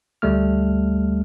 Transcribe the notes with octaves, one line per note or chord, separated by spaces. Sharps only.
D2 G3 A3 F6